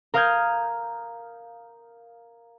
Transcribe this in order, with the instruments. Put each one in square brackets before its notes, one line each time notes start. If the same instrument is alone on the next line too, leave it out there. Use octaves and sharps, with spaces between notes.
[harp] A#4 F5 D#6 F6 G6 G#6